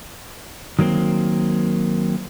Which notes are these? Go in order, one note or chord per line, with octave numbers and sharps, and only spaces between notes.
D#3 F#3 A#3 C4